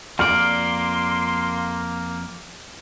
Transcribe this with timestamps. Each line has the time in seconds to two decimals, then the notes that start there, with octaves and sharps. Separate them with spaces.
0.19 F2 A#3 D5 C6 F6